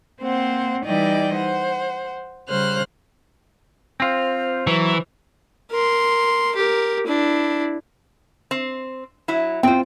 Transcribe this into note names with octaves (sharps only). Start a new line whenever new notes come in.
A#3 C4 C5 F#5
E3 G3 D#4 D5 D#5 G5
C5 F#5
C#3 G3 C5 F6 F#6
C4 F4 C5
E3 F#3
A#4 C6
G4 A#4
D4 E4
C4
F#3 E4
C4 F4 C5 G5